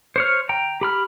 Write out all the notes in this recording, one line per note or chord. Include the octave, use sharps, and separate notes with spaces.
C5 C#5 F6
G5 A#5
G4 B5 F6